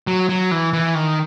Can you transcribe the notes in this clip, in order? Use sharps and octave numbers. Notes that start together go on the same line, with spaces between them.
F#3
F#3
E3
E3
D#3